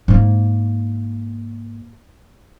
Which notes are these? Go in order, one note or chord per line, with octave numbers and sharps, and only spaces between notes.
G#2 A#3